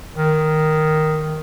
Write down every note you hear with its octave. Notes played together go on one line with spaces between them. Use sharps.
D#3